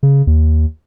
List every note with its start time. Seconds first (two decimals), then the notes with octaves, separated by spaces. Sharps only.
0.03 C#3
0.27 D#2